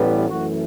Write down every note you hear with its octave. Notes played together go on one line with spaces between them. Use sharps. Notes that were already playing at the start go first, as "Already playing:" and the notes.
Already playing: A1 A2 E3 G3 B3
F#2 E3 A3 F#4